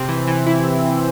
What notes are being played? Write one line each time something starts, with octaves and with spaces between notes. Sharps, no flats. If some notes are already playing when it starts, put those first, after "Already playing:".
Already playing: C3 C4
E3
E3
E4